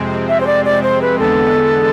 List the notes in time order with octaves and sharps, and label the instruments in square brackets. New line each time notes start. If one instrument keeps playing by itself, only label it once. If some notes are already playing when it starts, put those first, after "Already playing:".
Already playing: [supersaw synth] F2 C3 G#3 C4
[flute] E5
C5
D5
D5
C5
B4
[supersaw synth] E2 D3 G#3 B3 [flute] A4